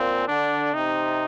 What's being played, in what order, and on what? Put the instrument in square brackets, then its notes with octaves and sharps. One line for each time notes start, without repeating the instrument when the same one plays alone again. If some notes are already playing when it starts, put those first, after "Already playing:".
Already playing: [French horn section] A#2 [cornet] C4
[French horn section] D3 [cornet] D4
[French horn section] C3 [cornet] D#4